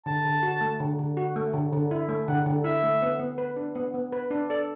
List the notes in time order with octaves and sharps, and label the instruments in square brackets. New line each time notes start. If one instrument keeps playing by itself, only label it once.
[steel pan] D3 [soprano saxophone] A5
[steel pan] D3
F#4
A3
D3
D3
F#4
A3
D3
D3
E4
A3
[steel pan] D3 [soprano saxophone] F#5
[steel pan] D3
[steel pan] E4 [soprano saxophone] E5
[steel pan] A3
B3
B3
B4
D4
B3
B3
B4
D4
[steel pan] A4 [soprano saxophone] D5